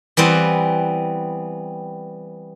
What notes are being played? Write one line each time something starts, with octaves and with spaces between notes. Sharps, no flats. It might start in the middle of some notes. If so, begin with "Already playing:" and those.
E3 G3 B3 C4